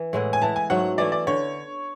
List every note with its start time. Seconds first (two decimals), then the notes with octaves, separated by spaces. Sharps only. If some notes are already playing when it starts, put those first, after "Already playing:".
Already playing: E3
0.13 A2 G#3 B3 E4
0.33 G#5
0.41 E3 B3 E4 A5
0.56 G#5
0.70 G#2 F#3 A3 C#4 F#5
0.98 E3 A3 E4 D5
1.12 D5
1.27 D3 C#5